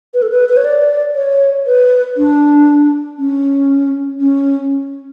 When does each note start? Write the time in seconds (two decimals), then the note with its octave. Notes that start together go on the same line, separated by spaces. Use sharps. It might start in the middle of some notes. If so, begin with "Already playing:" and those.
0.14 B4
0.22 A4
0.30 B4
0.49 B4
0.57 C#5
0.64 D5
1.15 C#5
1.66 B4
2.17 D4
3.19 C#4
4.20 C#4